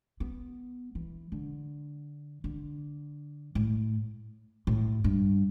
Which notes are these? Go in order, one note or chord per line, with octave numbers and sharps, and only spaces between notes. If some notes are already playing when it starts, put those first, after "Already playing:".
B3
E3
D3
D3
A2
A2
G2